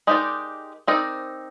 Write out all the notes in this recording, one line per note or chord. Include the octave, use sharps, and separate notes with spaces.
G#3 D#4 G4 A#4 D5
C4 D#4 A#4 D5